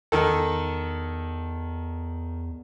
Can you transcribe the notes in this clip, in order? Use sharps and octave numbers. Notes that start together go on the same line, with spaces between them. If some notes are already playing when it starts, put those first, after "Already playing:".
E2 D#3 A4